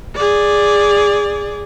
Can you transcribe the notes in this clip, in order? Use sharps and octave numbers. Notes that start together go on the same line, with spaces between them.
G#4 D5